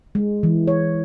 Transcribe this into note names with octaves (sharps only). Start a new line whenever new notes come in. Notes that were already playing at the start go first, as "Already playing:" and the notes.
G#3
E3
C#5